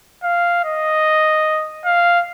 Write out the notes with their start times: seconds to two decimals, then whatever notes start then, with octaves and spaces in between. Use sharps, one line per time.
0.23 F5
0.64 D#5
1.85 F5